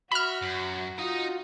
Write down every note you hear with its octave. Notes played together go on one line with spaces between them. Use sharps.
F#4 E5 B5 F6
F#2
D#4 F4 F#4 D#5